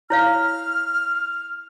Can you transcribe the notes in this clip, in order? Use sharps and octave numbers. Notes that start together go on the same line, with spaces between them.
E4 C#5 F5 F6